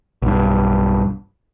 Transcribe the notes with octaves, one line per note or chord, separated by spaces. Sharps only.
B1 G2